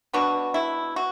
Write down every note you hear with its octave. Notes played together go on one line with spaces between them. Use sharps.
B2 B3 D4 F#4
E4
F#4